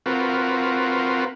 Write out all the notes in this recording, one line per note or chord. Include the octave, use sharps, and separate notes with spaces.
C4 F4 F#4 A#4 B4